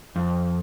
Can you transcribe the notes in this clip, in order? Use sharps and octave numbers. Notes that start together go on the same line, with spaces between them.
F2